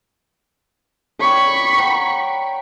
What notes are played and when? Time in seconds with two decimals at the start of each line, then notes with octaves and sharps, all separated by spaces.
1.20 C#5 D5 G5 B5 C#6
1.78 F#5 G5 A#5